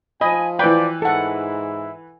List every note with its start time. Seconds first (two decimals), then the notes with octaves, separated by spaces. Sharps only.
0.21 F3 D#5 G#5 B5
0.59 E3 B4 D5 G5
1.02 G#2 E4 A4 F#5